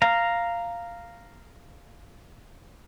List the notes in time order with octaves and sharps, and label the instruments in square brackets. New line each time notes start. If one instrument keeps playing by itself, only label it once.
[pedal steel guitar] F5 A#5